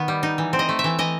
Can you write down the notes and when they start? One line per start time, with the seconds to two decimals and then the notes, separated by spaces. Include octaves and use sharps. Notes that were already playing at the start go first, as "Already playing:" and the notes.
Already playing: D#3 B3
0.08 G3
0.23 D#4
0.38 E3
0.53 C4
0.59 D#5
0.69 A3
0.79 E5
0.84 E3
0.99 E3 D#5